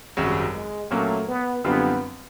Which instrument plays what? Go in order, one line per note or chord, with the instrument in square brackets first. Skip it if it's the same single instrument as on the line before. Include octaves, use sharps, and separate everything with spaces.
[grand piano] G#1 F#2 C#3 F#3 [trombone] G3
[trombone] G#3
[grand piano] A#2 F#3 A#3 C#4 [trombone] A3
[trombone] B3
[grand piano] F#2 D3 G3 C4 F4 [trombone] B3